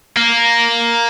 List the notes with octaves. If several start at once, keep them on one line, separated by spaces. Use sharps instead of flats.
A#3